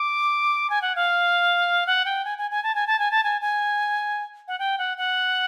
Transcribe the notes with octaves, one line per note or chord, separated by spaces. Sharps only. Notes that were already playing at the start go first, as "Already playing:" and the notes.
Already playing: D6
G#5
F#5
F5
F#5
G5
G#5
G#5
G#5
A5
G#5
A5
G#5
A5
G#5
G#5
F#5
G5
F#5
F#5